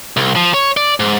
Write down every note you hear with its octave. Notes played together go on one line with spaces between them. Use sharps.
C2
F3
C#5
D5
G#2